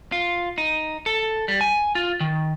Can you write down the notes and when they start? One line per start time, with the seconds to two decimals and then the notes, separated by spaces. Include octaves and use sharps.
0.12 F4
0.58 D#4
1.06 A4
1.48 G3
1.61 G#5
1.95 F4
2.21 D#3